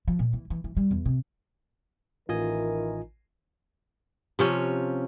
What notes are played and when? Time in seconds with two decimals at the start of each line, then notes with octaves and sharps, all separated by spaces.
0.08 F3
0.19 A#2
0.33 E3
0.50 E3
0.64 E3
0.77 G3
0.91 E2
1.05 C3
2.29 A1 D#3 E3 F4 A#4 D#5 G#5
4.39 C3 F3 C#4